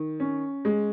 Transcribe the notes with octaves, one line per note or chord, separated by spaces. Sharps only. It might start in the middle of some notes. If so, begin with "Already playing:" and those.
Already playing: D#3
C#4
G#3